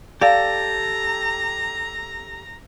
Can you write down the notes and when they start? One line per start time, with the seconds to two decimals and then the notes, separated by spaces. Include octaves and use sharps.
0.21 G4 A4 D5 F5 A#5